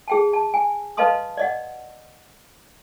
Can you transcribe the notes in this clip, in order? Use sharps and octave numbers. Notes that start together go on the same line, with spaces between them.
G#4 G5 A5
A5
G#5
B4 D#5 F5 A5 C6 D#6
D5 D#5 F#5